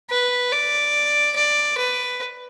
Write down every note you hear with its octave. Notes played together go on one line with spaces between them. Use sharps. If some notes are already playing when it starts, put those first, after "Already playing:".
B4
D5
D5
B4